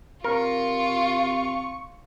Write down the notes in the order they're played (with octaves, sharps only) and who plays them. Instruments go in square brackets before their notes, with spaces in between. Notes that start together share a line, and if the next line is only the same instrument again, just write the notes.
[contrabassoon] C3 [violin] F4 [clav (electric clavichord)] A#4 [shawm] C#6